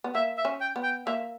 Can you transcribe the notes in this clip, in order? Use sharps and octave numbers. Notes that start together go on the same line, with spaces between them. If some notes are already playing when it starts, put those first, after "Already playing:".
B3
A#3 E5
E5
C#4
G5
B3
G5
A#3 E5